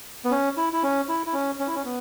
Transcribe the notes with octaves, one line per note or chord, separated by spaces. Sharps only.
B3
C#4
E4
E4
C#4
E4
E4
C#4
C#4
E4
C#4
B3